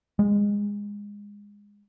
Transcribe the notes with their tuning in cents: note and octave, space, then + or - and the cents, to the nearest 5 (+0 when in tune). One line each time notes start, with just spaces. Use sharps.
G#3 -20